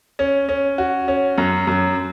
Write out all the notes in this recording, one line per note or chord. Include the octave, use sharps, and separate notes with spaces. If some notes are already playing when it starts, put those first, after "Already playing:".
C#4
C#4
F#4
C#4
F#2
F#2